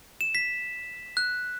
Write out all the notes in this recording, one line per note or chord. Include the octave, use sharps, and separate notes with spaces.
E7
B6
F#6